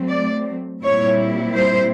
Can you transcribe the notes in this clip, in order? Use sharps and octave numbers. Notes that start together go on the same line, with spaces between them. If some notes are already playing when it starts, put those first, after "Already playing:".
Already playing: F#3 A3 C4
D5
A#2 G3 C4 E4 C#5
C5